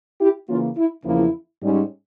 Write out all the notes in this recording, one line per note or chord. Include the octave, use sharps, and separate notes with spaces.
E4 G4
C#3 E3 A#3 C#4 F4
E4
E2 C#3 F3 A#3 E4
G#2 G3 C#4